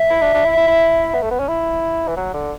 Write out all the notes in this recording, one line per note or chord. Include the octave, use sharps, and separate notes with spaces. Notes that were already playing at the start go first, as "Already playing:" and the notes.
Already playing: E5
E4
D4
D4
E4
E4
E4
B3
A3
B3
C#4
E4
E3
F#3
D3